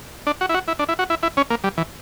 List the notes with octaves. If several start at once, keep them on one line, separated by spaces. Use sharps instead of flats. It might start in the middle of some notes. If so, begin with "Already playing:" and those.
D4
F#4
E4
F#4
E4
D4
E4
F#4
E4
E4
C#4
A#3
G3
E3